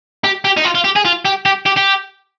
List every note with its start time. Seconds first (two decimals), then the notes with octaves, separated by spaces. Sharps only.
0.24 G4
0.45 G4
0.57 D#4
0.64 F4
0.75 F4
0.84 G4
0.96 G#4
1.05 F4
1.25 G4
1.46 G4
1.66 G4
1.77 G4